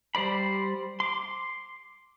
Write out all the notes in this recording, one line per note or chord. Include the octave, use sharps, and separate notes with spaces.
G3 C5 D5 B5
C6 D6